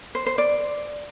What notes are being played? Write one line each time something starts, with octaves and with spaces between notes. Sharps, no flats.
C5
C5
D5